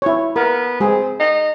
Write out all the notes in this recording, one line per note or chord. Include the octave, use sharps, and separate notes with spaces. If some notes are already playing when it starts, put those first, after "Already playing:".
E4 C#5
B3 A#4
G#3 C4 G#4
D#4